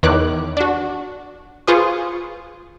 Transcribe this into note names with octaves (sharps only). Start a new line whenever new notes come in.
E2 D#3 B4 C#5 D6 F#6
D4 F#4
F4 G#4 B4 C5 C#6 D#6